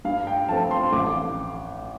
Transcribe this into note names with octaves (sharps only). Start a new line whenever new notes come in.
G2 F5
G5
F3 A3 C4 A5
C6
A1 D6